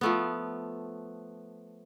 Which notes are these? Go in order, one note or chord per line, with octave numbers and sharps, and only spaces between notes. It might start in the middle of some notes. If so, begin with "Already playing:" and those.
F3 A3 B3